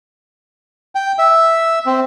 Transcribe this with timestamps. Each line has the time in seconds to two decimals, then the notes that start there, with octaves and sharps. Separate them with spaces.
0.95 G5
1.19 E5
1.86 C4